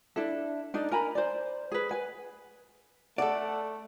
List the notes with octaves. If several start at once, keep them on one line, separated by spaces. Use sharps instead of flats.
D4 E4 A4
D4 D#4 A4
A#4 G#5 A#5 B5
C5 D5
G#4 B4
B4 G#5
A3 A4 D5 F#5